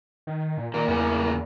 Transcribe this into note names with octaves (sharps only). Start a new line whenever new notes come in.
D#3
A#2
A#2 D#3 A#3
E2 A2 C#3 A#3